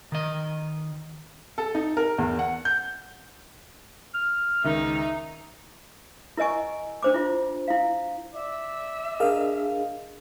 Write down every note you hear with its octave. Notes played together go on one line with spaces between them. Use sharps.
D#3 D#5
A4
D#4
A#4
E2
F#5
G6
F6
C#2 D#3 D#4 E5
E4 A#4 D#5 G#5 C#6
D4 C5 D6
E4 F4
E4 F5
D5 E5
D4 G#4 A#4 D#5 F5